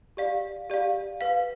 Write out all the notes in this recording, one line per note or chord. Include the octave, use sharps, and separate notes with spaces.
G4 D5 F5
G4 D5 F5
B4 F5